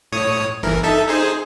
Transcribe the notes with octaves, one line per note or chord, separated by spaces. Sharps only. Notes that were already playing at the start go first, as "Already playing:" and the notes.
A2 C#5 D#6
G1 E3 A#4
D#4 A4 E5
D#4 G#4 C5